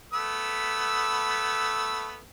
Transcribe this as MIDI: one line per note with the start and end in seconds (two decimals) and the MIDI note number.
0.13 2.21 57
0.13 2.21 59
0.13 2.21 88